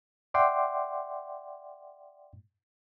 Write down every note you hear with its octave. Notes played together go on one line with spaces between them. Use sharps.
D5 E5 F#5 G5 C6 D6